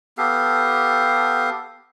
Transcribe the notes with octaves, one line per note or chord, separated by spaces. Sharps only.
B3 G4 A4 F5